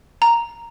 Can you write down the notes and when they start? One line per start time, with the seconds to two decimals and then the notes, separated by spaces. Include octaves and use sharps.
0.22 A#5